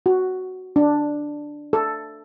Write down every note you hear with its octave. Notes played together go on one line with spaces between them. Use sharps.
F#4
D4
A4